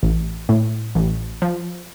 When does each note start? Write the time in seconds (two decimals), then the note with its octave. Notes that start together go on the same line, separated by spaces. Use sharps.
0.03 A1
0.49 A2
0.95 A1
1.42 F3